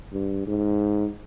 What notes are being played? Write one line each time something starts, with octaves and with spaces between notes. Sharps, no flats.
G2
G#2